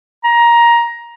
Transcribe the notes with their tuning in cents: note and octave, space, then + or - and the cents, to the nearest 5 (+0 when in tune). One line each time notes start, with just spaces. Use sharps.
A#5 +15